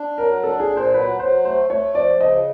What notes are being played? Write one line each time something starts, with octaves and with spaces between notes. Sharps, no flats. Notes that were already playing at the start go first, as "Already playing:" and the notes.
Already playing: D4
F#3 A#4
D4 A4
G#4
A#2
C5
F#3 B4
F#3 C5
A3 C5
A3 C#5
F3 D5
C#3 D#5